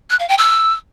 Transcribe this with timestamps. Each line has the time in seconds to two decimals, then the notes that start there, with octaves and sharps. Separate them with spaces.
0.10 F#6
0.19 F5
0.29 G5
0.38 E6